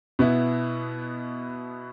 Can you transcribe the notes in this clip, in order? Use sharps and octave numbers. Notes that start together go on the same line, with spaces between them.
B2 B3 E4